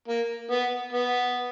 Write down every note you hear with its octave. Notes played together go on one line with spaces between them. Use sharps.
A#3
B3
B3